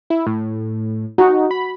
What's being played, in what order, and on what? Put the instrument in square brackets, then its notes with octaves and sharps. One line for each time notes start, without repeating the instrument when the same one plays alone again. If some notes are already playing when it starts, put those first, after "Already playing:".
[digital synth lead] E4
A2
[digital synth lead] D#4 [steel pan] F#4
[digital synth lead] B5